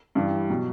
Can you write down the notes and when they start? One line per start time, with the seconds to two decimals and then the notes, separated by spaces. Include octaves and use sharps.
0.15 G2 E3 G3
0.50 B2 F#3